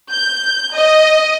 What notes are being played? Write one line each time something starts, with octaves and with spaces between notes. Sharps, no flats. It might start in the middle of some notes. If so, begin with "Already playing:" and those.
G6
D#5